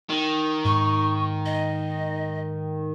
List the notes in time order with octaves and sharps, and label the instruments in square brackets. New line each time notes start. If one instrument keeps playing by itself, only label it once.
[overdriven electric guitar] D#3
[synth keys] G#2 [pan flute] C#6
[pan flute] D#5